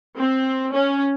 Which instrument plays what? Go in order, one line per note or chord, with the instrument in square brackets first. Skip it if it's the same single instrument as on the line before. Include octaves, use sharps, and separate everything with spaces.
[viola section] C4
C#4